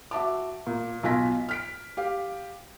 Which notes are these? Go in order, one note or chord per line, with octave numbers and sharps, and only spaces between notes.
F#4 E5 A5 D6
A#2
B1 F4 F5 G#5 A#6 B6
F6 B6 D7
G4 F5